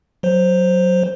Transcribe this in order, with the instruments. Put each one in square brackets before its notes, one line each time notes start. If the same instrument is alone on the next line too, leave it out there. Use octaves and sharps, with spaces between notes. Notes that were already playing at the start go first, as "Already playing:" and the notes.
[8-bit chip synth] F#3 C5